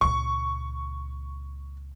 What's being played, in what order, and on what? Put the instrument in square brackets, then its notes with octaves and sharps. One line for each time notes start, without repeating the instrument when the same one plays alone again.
[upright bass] C#2 A#2 [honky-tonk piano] C#6